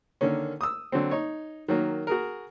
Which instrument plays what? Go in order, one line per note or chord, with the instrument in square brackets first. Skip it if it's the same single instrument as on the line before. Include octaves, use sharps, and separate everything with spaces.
[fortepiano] D3 D#3 A#3 C#4
D#6 E6
D3 F#3 C4
D#4 C#5
D#3 F#3 A#3
F#4 G#4 A#4